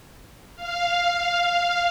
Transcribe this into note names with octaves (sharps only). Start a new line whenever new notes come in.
F5